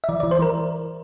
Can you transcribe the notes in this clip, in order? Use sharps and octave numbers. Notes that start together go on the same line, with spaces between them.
E5
E3 D5
E3 D5
C5
E3 A#4